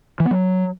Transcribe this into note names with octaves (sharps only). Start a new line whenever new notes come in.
E3
B3
F#3